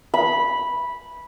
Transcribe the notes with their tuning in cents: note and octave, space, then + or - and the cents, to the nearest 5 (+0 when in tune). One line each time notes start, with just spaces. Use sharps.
B5 -10